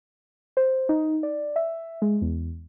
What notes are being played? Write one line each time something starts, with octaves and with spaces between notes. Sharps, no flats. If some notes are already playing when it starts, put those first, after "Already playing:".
C5
D#4
D5
E5
G#3
E2